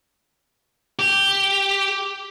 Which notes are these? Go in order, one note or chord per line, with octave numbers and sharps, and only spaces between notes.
G4